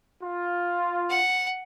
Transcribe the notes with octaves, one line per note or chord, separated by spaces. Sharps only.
F4
F#5